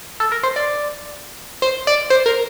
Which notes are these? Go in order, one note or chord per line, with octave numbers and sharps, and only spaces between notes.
A4
A#4
C5
D5
C5
D5
C5
A#4